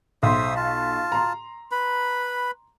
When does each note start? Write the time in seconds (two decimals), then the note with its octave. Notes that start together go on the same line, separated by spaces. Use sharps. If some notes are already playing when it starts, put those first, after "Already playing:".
0.23 B1 C5 E5 C6 D#6
0.56 F4 A5
1.12 A#5 C6
1.72 B4 B5